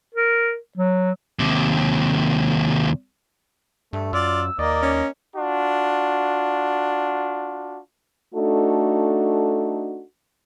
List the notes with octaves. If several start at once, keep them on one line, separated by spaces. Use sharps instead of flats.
A#4
F#3
D#2 C3
G2 A3
F#2 F4 D5 E6
D#2 A#3 D5 D#5
C#4
D4 F4 F#4
A3 D4 D#4 F#4 A4